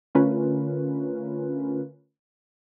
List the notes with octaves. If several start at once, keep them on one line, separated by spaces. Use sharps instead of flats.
D3 A3 C#4 F4 A#4 B4